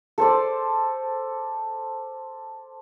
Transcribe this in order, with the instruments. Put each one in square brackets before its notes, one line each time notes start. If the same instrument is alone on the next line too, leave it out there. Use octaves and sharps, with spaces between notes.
[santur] A4 C5 D5